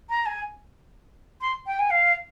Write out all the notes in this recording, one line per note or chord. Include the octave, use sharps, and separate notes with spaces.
A#5
G#5
C6
G5
G#5
F5